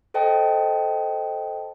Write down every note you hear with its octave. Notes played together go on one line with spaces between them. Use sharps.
A4 C5 D#5 G5 A5